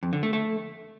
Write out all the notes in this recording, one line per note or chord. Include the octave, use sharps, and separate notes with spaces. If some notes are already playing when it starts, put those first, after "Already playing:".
F2
D3
A3
A3